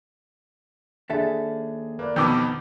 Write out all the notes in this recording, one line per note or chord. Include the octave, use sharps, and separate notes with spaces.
D#2 D4 G#4 A4 E5
A#3 B4 D5
F2 B2 D#3 B3 D#4 D6 E6 G6